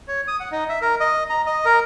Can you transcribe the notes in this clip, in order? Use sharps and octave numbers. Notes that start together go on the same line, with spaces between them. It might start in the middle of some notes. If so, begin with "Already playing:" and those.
C#5
D#6
F#5
D#4
E5
A#4
D#5
A#5
D#5
A#4